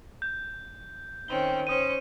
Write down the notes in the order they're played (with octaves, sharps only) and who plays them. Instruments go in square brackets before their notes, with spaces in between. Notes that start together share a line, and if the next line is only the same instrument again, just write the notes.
[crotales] G6
[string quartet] D#3 C4 C#4 [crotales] G7
[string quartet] C#4 C5 [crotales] D#6 D#7